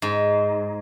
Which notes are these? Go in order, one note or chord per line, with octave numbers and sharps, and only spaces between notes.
G#2